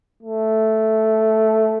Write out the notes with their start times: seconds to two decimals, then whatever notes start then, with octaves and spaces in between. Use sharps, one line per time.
0.23 A3